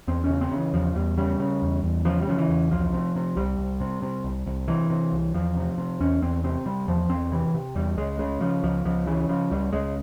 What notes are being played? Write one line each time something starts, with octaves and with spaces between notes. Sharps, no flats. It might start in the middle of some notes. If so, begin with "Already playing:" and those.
E2 C4
C#4
C#3
C4
C#3
E3
E2 F3
E2 G3
C#3 G3
C#3
E2
E2
C#3 F3
G3
C#3 F3
E3
E2
C2 F3
C3
C3
C2 G3
C2
C3
C3
C2
C2
C3 E3
C3
C2
E2 F3
C3
C3
E2 C#4
E2 C4
C3 C4
C3 G3
E2 F3
E2 C4
C3 E3
C3
E2 G3
C#2 G#3
C#3 G#3
C#3 F3
C#2 F3
C#2 F3
C#3 E3
C#3 F3
C#2 G3
C#2 G#3